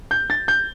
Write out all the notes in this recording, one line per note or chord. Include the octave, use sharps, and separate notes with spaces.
G6
A6
G6